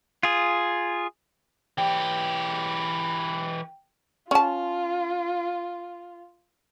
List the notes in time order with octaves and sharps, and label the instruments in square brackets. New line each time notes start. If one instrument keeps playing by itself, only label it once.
[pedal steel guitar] F4 G#4
[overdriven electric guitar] E3 G4 [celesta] G5
[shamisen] C#4 A5 [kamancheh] F4